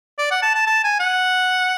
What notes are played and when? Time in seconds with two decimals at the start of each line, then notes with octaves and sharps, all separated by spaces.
0.18 D5
0.31 F#5
0.43 A5
0.55 A5
0.67 A5
0.84 G#5
1.00 F#5